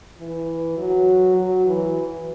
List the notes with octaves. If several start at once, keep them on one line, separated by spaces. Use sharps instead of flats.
E3
F#3
F#3
E3